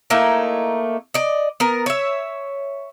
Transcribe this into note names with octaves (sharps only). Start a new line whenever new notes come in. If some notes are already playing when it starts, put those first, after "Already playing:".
A3 A#3 D#4 E4
D5 D#5
B3 A#4
C#5 E5